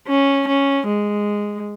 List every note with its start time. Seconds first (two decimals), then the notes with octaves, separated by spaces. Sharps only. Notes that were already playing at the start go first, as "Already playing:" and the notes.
0.08 C#4
0.48 C#4
0.87 G#3